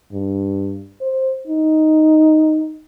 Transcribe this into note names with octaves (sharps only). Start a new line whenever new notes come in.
G2
C5
D#4